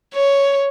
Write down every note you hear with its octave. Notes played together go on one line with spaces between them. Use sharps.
C#5